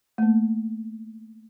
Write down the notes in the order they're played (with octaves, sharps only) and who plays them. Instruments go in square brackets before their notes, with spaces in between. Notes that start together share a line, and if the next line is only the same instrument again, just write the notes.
[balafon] A3 A#3